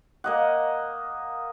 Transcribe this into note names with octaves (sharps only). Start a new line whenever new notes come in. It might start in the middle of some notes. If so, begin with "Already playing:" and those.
A#3 D#5 F#5